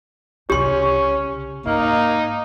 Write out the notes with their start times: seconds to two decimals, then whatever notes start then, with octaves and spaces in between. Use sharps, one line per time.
0.50 C2 C#3 C#4 G4 C6
1.66 G#2 A#3 D#4